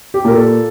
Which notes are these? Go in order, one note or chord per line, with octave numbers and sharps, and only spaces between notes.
G4
A#2 A#4
A4